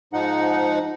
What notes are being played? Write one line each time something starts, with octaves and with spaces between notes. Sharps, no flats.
G#2 F3 D#4 F#5